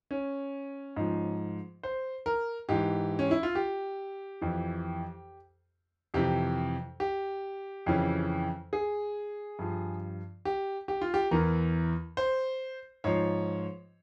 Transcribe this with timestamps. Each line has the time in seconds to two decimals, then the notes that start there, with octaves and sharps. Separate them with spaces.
0.11 C#4
0.96 G#2 F3
1.83 C5
2.26 A#4
2.69 G#2 E3 G4
3.19 C#4
3.31 E4
3.43 F4
3.55 G4
4.41 F2 E3
6.14 F2 C3 E3 G4
7.00 G4
7.86 F2 C#3 E3
8.73 G#4
9.59 G2 F3
10.45 G4
10.88 G4
11.01 F4
11.14 G4
11.31 E2 E3 A#4
12.17 C5
13.04 G#2 F3 C#5